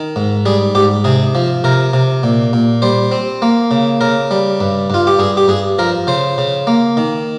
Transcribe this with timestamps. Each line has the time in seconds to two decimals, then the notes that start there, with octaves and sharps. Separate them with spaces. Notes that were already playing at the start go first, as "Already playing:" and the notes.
Already playing: D#3
0.16 G#2
0.46 G3 G#4
0.75 G#2 G4
1.04 C3 G#4
1.35 F3
1.64 C3 A#4
1.93 C3
2.23 A#2
2.53 A#2
2.82 G3 C5
3.12 C4
3.42 A#3
3.71 C#3
4.01 C#3 A#4
4.31 G3
4.60 G2
4.90 G2 F4
5.07 G4
5.19 G2 G#4
5.37 G4
5.48 G2 G#4
5.79 F3 A#4
6.07 C#3 C5
6.38 C#3
6.67 A#3
6.97 D#3